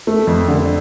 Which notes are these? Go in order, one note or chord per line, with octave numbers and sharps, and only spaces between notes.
A3
F2
D3